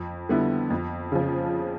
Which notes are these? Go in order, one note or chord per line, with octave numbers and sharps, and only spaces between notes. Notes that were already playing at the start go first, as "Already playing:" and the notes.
Already playing: F2
D3 G3 B3 E4
F2
C#3 F3